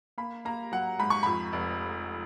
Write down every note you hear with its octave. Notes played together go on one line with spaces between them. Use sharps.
A#3 B5
A#3 A#5
F#3 F#5
G#2 B5
C#6
F2 B5
F1